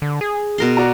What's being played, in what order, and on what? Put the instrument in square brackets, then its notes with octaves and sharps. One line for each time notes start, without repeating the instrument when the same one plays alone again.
[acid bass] D3
G#4
[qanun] B2 A#4 C6
[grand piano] F#4 D5 A#5